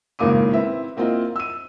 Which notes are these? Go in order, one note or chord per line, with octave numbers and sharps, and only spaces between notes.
G#1 A2 C#3 A#3 D6 D#7
C4 E4 B4 E5
A#3 C4 E4 F4 D#5 F5
E6 D#7